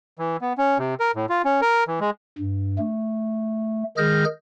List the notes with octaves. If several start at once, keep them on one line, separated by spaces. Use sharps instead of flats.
E3
B3
C#4
C3
A#4
A2
F4
C#4
A#4
E3
G#3
G2
A3
D#3 G#3 G#4 F6 G6 A#6